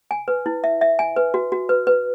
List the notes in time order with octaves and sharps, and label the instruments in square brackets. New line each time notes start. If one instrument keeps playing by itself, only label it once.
[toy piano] G#5
B4
E4
E5
E5
G#5
B4
F#4
F#4
B4
B4